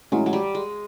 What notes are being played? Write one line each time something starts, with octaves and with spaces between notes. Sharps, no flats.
A2 E3 F#3 G#3 C#4 E4
F#3
G3
G#3